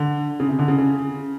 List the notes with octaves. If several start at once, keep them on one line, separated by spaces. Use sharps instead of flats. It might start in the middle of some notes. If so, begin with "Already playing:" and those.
Already playing: D3
C#3
C3
D3
C#3
C#3